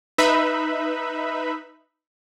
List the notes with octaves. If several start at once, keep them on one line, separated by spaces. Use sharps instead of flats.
D#4 B4 E5 B5